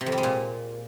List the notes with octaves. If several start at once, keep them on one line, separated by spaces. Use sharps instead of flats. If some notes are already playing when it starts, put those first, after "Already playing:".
C3
F2
G3
G#3
A#2